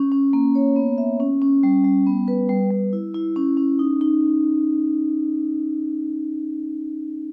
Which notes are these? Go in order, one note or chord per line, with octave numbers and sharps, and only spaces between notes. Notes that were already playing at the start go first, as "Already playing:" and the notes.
Already playing: C#4
C#4
A#3
C#5
B3
E5
C#4
C#4
G3
G3
B3
B4
G3
G3
E4
E4
C#4
C#4
D#4
D#4